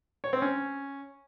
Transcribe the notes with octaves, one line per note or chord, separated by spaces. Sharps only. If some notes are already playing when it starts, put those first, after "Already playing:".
C#5
C4
C#4